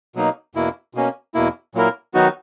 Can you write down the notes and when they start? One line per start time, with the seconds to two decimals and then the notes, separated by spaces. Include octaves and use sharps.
0.15 B2 F#3 A#3 D#4
0.55 E2 B2 A#3 E4
0.94 B2 A#3 C#4
1.34 E2 B2 A#3 E4
1.75 A#2 F#3 A#3 E4 A#4
2.14 D#3 F#3 B3 D#4 F#4